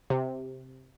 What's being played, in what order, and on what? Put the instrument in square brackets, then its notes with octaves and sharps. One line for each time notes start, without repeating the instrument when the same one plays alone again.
[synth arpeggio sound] C3